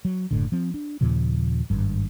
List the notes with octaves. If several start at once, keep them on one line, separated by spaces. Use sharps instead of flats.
F#3
F#1 A2 D3
F3 C4
D4
D#2 A#2 C#3 F3
G#1 G2